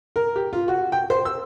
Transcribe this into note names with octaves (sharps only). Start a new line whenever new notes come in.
A#4
G4
F4
F#4
G5
C5
E6